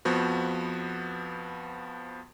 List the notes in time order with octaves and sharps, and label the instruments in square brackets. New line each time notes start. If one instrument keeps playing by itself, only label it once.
[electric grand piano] F2 F3 B3 F#4